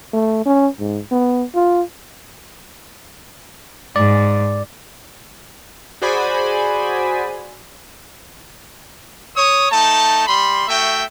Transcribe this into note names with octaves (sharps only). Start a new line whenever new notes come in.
A3
C#4
G#2
B3
F4
G#2 D5
F#4 G#4 C5 D5 G#5 B5
C#5 D#6
A3 D#4 A5
G3 B5 C6
A3 F#4 E5 G5